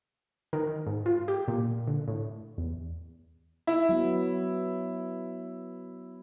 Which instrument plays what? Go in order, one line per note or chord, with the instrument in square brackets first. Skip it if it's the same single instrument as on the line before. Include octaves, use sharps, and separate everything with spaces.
[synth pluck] D#3
G#2
F4
G4
A#2
D3
A2
E2
[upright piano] E4
[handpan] F#3 B3